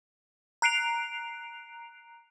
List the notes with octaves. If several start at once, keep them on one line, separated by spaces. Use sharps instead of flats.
A#5 F#6 C7 D7 F7